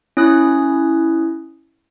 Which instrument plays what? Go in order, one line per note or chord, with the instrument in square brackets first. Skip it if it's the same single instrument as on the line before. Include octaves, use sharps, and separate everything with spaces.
[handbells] C#4 E4 C#5 D#6 F#6 A#6